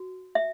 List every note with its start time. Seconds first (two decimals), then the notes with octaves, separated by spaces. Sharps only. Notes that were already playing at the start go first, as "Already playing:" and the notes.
Already playing: F#4
0.35 E5